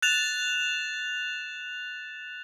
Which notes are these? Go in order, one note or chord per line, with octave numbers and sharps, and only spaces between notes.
F#6 A6 E7 F7